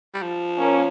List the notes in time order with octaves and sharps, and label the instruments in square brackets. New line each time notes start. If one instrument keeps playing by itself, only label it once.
[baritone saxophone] G3
F3
[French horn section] A#3 C#4